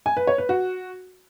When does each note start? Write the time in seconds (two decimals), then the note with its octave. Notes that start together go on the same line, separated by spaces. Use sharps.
0.06 G#5
0.17 B4
0.27 C#5
0.38 B4
0.49 F#4